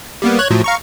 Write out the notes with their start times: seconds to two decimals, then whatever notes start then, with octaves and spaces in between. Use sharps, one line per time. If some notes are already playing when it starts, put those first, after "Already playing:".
0.22 G3 A#3 B3
0.39 C#5 F#6 G#6
0.50 A2 F3 F#3
0.64 F5 A#5 C#6